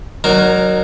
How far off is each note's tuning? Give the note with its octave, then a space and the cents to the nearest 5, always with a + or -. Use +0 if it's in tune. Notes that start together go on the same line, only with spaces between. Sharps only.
F#3 +0 D#4 -35 A#4 +0